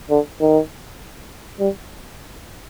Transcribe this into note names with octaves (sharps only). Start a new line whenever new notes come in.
D3
D#3
G3